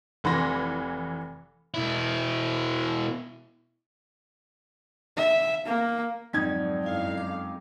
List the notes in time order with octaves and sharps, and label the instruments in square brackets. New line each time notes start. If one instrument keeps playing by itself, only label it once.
[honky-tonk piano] F1 E3 B5 C6 A#6
[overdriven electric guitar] B2 E4
[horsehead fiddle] E5
A#3
[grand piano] F2 D#4 G#6 [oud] G#2 D3 [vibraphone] F#3
[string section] F#2 F5 [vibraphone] E4
[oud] G#3 [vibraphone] D6